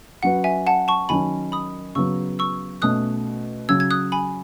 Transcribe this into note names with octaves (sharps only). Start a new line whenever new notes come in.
F#3 C#4 F#4 B4 F#5
E5 G#5
F#5 A5
A5 C#6
D#3 F#3 C#4 G#5 B5
B5 D#6
C#3 F#3 B3 C#6 E6
C#6 E6
B2 A3 C#4 D#6 F#6
C#3 F#3 C#4 E6 G#6
G#6
D#6 F#6
G#5 B5